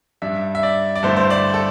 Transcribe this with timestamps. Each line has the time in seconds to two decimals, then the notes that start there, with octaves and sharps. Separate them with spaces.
0.22 G2 G3 D4 E5
0.55 E5
0.63 D5
0.95 D5
1.03 G2 D3 A3 E4 C5
1.17 C5
1.30 D5
1.54 A4